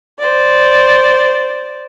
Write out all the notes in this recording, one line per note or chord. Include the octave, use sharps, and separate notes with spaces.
C5 D5